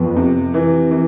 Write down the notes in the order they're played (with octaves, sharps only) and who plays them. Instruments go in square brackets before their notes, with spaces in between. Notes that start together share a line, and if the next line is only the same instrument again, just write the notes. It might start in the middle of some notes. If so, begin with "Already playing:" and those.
Already playing: [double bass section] F2 [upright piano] B3
[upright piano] C3
E3
E3